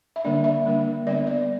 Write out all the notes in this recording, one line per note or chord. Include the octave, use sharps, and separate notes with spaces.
E5
D3 G3 A#3 D4 D5
E5
D3 G3 A#3 D4
D3 G3 B3 D4 D5
D5
D5